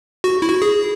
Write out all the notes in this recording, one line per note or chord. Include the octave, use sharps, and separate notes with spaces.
F#4
E4
F#4
G#4